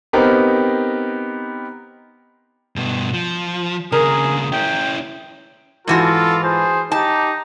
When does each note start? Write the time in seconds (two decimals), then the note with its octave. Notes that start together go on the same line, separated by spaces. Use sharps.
0.13 B3 C4 D#4 G4 A#4
2.76 G2 B2
3.14 F3
3.92 D#2 C#3 G#4 A#4
4.52 C#4 E4 G5
5.87 G#2 E3 F4 F#4 A4
6.44 G#4 C5
6.92 D#4 G4 A5